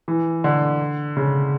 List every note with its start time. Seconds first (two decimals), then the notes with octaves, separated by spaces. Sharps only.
0.08 E3
0.44 D3
1.17 C#3